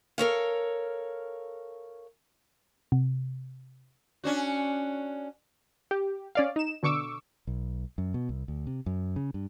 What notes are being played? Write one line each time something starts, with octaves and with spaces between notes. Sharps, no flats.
A4 A#4 C#5 F5
C3
C#4 D4 F#4
G4
C#4 D5 F5
D#4 E7
B2 D3 C#6 D6 E6
B1
F#2
B2
C2
D2
C3
F#2
C#3
G2